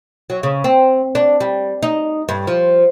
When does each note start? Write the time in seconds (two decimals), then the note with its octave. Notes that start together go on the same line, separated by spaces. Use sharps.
0.30 F#3
0.43 C#3
0.64 C4
1.15 D4
1.40 G3
1.83 D#4
2.29 G2
2.47 F3